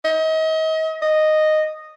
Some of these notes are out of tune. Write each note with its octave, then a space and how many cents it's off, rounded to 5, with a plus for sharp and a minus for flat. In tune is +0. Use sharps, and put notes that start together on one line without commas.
D#5 +35
D#5 -10